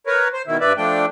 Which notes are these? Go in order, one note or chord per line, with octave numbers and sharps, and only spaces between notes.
A#4 B4 C#5
C5
B2 D#3 E4
G2 B4 D5 E5
F3 A3 D4 G5